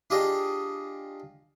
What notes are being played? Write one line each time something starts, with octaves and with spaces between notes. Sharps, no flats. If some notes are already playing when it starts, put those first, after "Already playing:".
D4 F4 G4 G#4 D#5